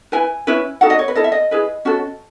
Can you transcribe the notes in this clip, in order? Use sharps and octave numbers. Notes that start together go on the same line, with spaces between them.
E4 B4 G#5
C#4 E4 B4
D#4 F#4 A4 F#5
D#5
C#5
B4
E4 A4 D#5
E5
D#5
E4 G#4 B4
C#4 F#4 A4